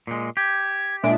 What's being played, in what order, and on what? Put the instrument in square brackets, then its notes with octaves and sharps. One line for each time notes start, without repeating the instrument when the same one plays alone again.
[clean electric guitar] A#2 G#3
[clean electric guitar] G4 [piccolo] G#6
[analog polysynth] A#2 G#3 D4 [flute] E5 [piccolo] D7